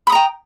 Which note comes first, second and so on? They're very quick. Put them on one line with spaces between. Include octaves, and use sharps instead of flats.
B5 D#6 A#5 G5